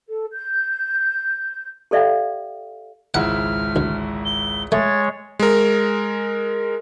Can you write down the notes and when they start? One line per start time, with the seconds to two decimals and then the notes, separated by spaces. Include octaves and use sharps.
0.08 A4
0.32 G6
1.91 G4 A4 D5 E5 F5 G5
3.14 G#1 C#2 E4 F#5 F6
3.76 D2
4.25 G7
4.72 G#3 A3 C#5 A6
5.39 G#3 A#4